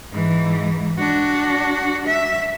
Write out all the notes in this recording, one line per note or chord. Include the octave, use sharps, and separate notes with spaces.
G#2 E3
D4 F#4
E5